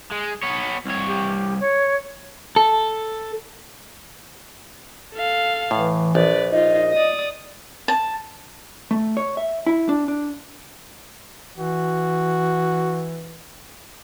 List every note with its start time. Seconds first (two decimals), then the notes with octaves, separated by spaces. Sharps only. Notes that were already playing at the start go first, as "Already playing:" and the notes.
0.12 G#3
0.43 B3 C#5
0.85 C2 C#5
1.07 G4
1.60 C#5
2.56 A4
5.14 A4 F5
5.71 A2 E3
6.15 A#1 B4 D5
6.52 D#4 F4 D#5
6.94 D5 D#6
7.88 A5
8.91 A3
9.17 C#5
9.37 E5
9.66 E4
9.89 D4
10.08 D4
11.58 E3 F#4